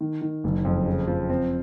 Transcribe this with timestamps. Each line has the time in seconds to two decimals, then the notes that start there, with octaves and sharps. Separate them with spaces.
0.01 D#3
0.22 D#3
0.44 F#1
0.65 F2
0.86 C#3
1.07 F3
1.29 C4